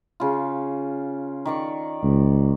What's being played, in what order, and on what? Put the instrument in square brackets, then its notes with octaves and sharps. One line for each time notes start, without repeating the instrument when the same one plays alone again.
[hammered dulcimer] C#3 F4
D#3 D5 C#6
[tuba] C#2